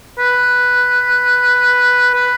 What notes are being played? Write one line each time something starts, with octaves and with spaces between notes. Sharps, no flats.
B4
B4